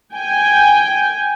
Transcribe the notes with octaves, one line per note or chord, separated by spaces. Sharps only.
G5 G#5